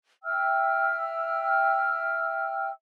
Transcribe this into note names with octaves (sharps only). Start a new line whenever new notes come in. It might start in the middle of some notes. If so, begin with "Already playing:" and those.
E5 G5 E6 F6